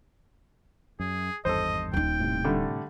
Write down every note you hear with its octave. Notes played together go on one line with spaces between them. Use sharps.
F#2 G#4
G#1 E2 G2 A4 C5 D#5
D#1 D#4 G5
A2 C3
D3 G3 A3